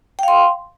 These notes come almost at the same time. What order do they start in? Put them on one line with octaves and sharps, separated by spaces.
G5 F5 C6